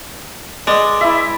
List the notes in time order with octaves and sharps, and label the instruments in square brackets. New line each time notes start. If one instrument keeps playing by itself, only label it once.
[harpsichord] G#3 [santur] D5
[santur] E4 E5